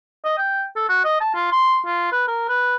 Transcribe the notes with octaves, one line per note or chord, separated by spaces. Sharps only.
D#5
G5
A4
F#4
D#5
A5
F4
C6
F4
B4
A#4
B4